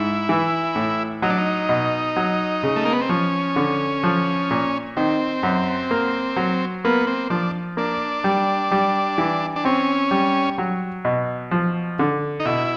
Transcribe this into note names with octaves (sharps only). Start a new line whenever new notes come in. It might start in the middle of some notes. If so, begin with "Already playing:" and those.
Already playing: G#2 E4
E3
A2
F#3 D#4
D4
D#4
B2
F#3
C#3
A3
A#3
B3
C4
F3 C#4
D3
F3
A#2
D#3 C4
F#2
A#3
F#3
A#3 B3
C4
F3 D4
A#3 D4
G3
G3
E3
D4
C4 C#4
G3
F#3
B2
F3
D3
D#4
B2 E4